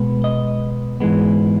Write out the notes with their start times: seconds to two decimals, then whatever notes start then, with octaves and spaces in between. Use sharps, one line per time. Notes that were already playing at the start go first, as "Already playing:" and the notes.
Already playing: B2 G#3 B3
0.24 D#5
1.00 G#2 E3 G#3 B3